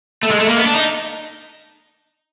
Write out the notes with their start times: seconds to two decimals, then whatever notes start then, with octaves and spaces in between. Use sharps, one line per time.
0.23 A3
0.31 G#3
0.40 A3
0.49 A#3
0.58 B3
0.66 D4
0.75 D#4